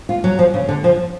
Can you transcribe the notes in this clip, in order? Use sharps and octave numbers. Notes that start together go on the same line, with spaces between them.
F4
F#3
F3
C#3
D3
F3